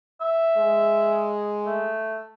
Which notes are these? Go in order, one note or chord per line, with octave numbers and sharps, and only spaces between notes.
E5
G#3
A3